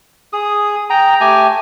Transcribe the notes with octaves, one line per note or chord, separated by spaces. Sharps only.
G#4 D#6
G5 A#5
A3 G4 G#5